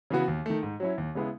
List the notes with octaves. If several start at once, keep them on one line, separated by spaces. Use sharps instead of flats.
C#3 E3 B3 F#4
D#2
D#3 A3
G#2
F#3 C#4 E4
D#2
C#3 G#3 B3 E4